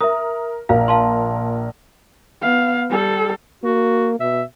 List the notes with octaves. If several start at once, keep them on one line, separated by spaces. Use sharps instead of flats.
A#4 E5 D#6
A#1 A#4 F5
F5 A5 C6
B3 F5
G3 A4
A#3 F#4
B2 E5